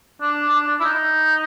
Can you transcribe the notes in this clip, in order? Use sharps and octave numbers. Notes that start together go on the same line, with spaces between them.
D4
D4
D4
E4
D#4